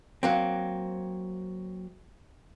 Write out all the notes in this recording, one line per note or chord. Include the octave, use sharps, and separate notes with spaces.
F#3 A#3 C4